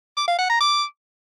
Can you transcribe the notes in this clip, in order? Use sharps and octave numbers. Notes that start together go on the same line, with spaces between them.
D6
F5
F#5
A#5
D6